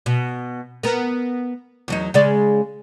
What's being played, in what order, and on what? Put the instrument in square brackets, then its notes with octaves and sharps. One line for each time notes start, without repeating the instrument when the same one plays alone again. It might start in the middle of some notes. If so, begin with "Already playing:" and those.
[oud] B2
B3 A#4
E2 F#3 D#4
C#3 G#3 D5